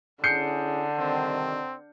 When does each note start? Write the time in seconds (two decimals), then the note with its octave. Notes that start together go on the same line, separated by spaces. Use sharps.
0.24 D3 C#4 E4 G#4 G6 C7 C#7
0.98 G2 C3 D#3 C4